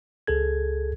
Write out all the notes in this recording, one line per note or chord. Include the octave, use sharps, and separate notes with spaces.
C#2 G#4 A4 G#6